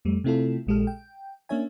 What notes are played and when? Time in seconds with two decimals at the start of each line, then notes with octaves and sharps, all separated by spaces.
0.05 F2 G3 A3
0.24 C3 A3 C4 E4 F4 A4
0.67 A#1 A#2 G#3 G4 A4 F6
0.87 G5
1.49 A#3 C#4 D4 C#5 E5 G#5